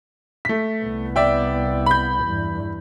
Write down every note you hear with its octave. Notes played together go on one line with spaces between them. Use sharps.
A3 B6
C2 B3
D5 E5 G5
B5 G6
E2 G2